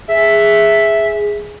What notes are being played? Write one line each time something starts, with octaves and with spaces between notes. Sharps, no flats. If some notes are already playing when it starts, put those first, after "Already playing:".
G#4 E5